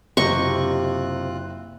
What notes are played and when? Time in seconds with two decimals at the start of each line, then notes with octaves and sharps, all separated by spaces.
0.17 F#1 C3 C4 F4 G4 D#5 C#6 F#6